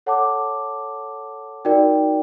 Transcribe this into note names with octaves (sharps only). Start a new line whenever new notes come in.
A4 C#5 F#5 A5 D6
D#4 F#4 A#4 D5 G5